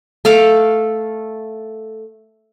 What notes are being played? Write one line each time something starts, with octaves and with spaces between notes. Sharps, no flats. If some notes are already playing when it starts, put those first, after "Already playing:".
A3 A4 F5 D6